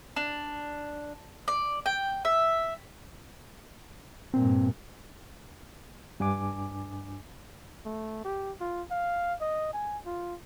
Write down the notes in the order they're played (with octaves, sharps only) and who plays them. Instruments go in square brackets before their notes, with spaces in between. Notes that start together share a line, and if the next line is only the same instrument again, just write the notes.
[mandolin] D4
D5
G5
E5
[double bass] G2 A#2 [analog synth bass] C4
[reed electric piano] G2 D4 G#5 D6
[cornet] A3
G4
F4
F5
D#5
G#5
F4